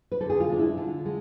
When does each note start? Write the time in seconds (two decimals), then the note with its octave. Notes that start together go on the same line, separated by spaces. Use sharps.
0.11 B4
0.21 D3 A4
0.30 G#4
0.40 F4
0.49 G#3 D4
0.59 E4
0.77 D3 F4
1.05 G#3